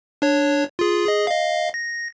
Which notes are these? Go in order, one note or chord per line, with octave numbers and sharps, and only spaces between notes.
D4 C#5
F4 G#4
G#4 D#5
D#5 F5
A#6